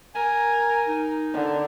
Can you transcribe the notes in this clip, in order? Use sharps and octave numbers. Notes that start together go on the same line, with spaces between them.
A#4 G#5
D#4
D3